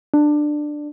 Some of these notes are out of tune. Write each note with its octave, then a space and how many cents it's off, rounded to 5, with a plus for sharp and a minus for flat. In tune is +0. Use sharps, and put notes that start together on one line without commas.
D4 +15